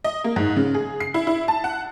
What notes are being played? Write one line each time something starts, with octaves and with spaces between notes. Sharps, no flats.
D#5
A#3
G#2
C#3
G#4
C7
E4
E4
A5
F#5